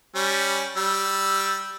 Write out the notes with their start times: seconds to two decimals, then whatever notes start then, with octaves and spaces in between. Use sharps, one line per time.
0.15 G3 C#4
0.77 G3 E6